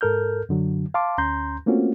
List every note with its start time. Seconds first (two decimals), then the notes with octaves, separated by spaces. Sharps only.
0.01 G#2 A4 A#4 F6 G6
0.49 F#2 D3 F#3
0.94 F5 A5 C6 D6
1.18 D2 C#4 A#5 C6 G6
1.66 A3 A#3 C4 C#4 F4 F#4